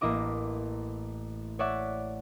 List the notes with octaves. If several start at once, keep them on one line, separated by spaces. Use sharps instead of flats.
A1 A#3 E4 D#5 D6
C#5 D5 E5 F#5 D6